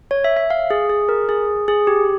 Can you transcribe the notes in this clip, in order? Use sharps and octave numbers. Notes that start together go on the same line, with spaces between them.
C#5
E5
E5
F5
G#4
G#4
A#4
G#4
G#4
G4